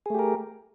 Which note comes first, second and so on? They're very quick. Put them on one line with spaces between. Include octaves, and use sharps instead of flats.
G#4 A3 G4 A#4